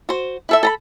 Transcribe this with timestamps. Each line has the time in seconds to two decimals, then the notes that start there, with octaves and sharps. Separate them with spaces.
0.09 F#4 C5
0.49 E4 A4 E5
0.63 A4 A#5 B5